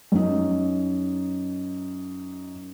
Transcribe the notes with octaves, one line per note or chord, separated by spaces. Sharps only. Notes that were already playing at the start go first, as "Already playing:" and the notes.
F#2 D#4